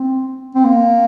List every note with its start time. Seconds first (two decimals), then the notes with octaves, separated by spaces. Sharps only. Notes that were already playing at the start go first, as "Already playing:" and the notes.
Already playing: C4
0.55 C4
0.65 A#3